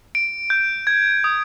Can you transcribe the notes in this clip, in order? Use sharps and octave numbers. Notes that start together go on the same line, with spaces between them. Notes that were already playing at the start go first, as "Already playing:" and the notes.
D7
G6
G#6
D#6